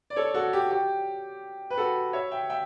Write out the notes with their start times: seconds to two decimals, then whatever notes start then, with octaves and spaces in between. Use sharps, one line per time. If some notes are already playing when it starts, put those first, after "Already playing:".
0.10 D5
0.16 A4 C#5
0.34 F#4 A4
0.53 G4
0.71 G4
1.70 B4
1.78 F#4 A4
2.13 C#5 E5
2.31 E5 G5
2.50 E5 G5